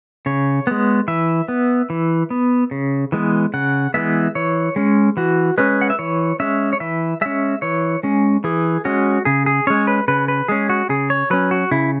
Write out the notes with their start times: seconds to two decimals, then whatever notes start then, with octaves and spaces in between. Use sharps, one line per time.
0.26 C#3 C#5
0.67 G#3 B3
1.08 E3 E5
1.48 B3
1.90 E3
2.30 B3
2.71 C#3
3.12 E3 G#3 B3
3.54 C#3 F#5
3.94 E3 G#3 B3 E5
4.35 E3 C#5
4.76 G#3 C#4
5.17 E3 F#4
5.58 G#3 C#4 B4
5.81 F#5
5.90 E5
5.99 E3 C#5
6.40 G#3 C#4 E5
6.73 C#5
6.80 E3 E5
7.21 G#3 C#4 E5
7.62 E3 C#5
8.03 G#3 C#4
8.44 E3 G#4
8.85 G#3 C#4 F#4
9.25 C#3 G#4
9.46 G#4
9.67 G#3 C#4 C#5
9.87 B4
10.08 C#3 B4
10.28 B4
10.48 G#3 C#4 G#4
10.69 F#4
10.89 C#3 G#4
11.10 C#5
11.30 F#3 C#4 B4
11.51 F#4
11.71 C#3 E4